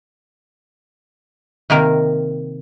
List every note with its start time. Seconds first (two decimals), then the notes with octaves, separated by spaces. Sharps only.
1.70 C3 D#3 A#3 A#4